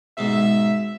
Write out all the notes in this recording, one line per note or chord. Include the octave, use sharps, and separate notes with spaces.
G#2 B2 E5